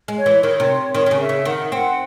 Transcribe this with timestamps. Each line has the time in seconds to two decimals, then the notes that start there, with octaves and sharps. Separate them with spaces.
0.08 G#3
0.18 C#5
0.26 E3
0.43 D#3 C#5
0.60 C3
0.95 D#3 C#5
1.06 D#3
1.11 C#3
1.20 E5
1.29 C#3
1.45 D#3 F#5
1.71 C4 F#5